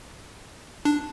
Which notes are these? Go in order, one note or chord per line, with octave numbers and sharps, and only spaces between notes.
D4